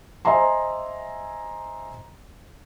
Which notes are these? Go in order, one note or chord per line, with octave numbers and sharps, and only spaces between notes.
C5 D#5 E5 G#5 A#5 C6